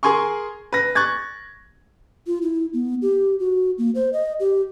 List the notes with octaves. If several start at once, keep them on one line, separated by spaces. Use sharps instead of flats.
G#4 A#4 G#5 C6 C#6
B4 A#6
C#6 F#6 G#6 A6
F4
E4
B3
G4
F#4
A#3
C5
D#5
G4